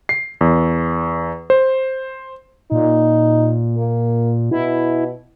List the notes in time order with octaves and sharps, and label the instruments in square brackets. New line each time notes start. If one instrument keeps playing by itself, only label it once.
[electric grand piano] C7
E2
C5
[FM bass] A#2 [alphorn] D#4
[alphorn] A#3
[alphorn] B2 [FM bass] E4